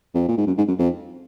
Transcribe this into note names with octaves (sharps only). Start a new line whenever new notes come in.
F2
A#2
G#2
F#2
G#2
F#2
F2